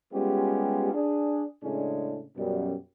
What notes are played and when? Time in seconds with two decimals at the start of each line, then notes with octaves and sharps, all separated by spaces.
0.13 G3 G#3 B3 C#4 F4 G4
0.93 D4 G#4
1.63 A2 C#3 G#3 C#4 D4
2.37 F#2 B2 G3